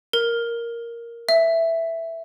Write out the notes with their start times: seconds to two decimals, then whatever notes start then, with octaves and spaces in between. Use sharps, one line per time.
0.13 A#4
1.29 E5